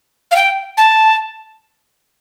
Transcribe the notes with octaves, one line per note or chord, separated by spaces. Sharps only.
F5
G5
A5